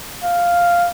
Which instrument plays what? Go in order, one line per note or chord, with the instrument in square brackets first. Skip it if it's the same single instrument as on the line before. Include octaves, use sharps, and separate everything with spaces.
[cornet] F5